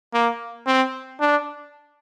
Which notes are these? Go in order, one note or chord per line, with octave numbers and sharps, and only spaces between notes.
A#3
C4
D4